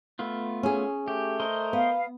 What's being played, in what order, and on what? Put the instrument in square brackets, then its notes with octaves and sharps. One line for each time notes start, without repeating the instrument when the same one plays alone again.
[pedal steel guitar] A3 B3 F4
[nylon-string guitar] C#4 G#4
[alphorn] A3 [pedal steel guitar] G4
[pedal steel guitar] A#4 C5 D#5
[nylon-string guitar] B3 [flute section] F5